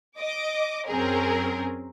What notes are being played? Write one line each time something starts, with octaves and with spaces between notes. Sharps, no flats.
D#5 D6
F#2 C4 C#4 G#4 A#4